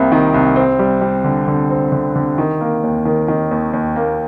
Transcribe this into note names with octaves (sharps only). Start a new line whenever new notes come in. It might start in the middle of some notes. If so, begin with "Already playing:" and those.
Already playing: C2 C3 A#3
D#3
C2
C4
G3
G3
D3
D3
C4
D3
D3
D#3
A#3
D#2
D#3
D#3
D#2
D#2
A#3